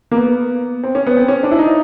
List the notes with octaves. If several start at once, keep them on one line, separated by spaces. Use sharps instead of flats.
A#3
B3
C4
C#4
B3
C4
C#4
D4
E4
D#4